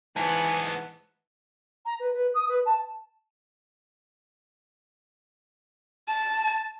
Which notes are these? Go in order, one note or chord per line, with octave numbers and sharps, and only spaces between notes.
G#2 E3 B3 G#5 A5
A#5
B4
B4
D#6
B4
A5
A5